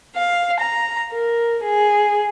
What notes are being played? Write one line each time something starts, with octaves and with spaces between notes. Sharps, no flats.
F5
A#5
A#4
G#4